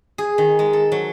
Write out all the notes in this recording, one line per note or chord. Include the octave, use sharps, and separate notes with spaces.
G#4
D#3
G#3
A4
F#3